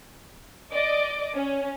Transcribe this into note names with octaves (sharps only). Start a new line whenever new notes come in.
D5 D#5 D6
C#4